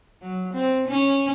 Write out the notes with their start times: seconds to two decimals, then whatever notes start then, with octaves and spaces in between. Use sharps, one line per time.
0.22 F#3
0.54 C4
0.88 C#4